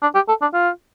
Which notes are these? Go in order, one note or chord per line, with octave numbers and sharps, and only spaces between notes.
D4
G4
A4
D4
F4